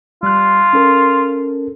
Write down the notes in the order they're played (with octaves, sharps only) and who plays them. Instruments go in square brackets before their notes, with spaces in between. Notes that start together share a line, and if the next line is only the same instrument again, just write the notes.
[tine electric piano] G3 F#6 [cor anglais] F4
[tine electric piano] C#4 A4 A#4